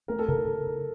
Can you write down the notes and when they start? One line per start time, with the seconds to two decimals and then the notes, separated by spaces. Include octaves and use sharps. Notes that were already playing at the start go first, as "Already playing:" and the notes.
0.08 A3 A#4
0.19 A4
0.28 C#3 A#4